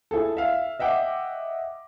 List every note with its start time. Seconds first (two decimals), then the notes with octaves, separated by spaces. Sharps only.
0.11 E4 G#4 A4
0.37 E5 F5
0.79 D#5 E5 F#5 G5 D6